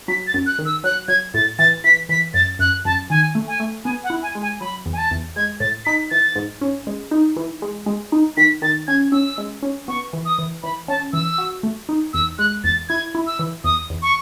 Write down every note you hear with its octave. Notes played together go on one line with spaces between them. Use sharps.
F#3 B6
A6
F#2
F#6
D#3
E6
F#3 F#6
F#3 G#6
A2 A6
E3 A6
E3 B6
E3 B6
F#2 A6
F#2 F#6
F#2 A5
D#3 G#5
A3
G#5
A3
B3 G#5
F#5
E4
G#5
G#3
G#5
F#3 B5
E2
G#5
A5
E2
G#3 G#6
A2 A6
D#4 B6
E3 A6
G#2
C#4
G#3
D#4
E3
G#3
G#3
D#4
D#3 B6
D#3 A6
C#4 G#6
C#4 E6
G#3
C#4
B3 C#6
E3
D#6
E3
E3 B5
C#4 A5
E3 E6
F#4
A3
D#4
E2 E6
G#3 F#6
E2 A6
E4 G#6
E4
E6
E3
E2 D#6
E2
C#6